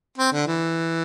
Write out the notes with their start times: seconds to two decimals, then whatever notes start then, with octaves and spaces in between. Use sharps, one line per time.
0.18 C4
0.32 D3
0.47 E3